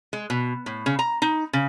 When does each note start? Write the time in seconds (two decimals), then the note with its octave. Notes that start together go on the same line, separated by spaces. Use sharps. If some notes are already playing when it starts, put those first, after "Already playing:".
0.13 G#3
0.30 B2
0.66 A2
0.86 C#3
0.99 A#5
1.22 D#4
1.53 C#3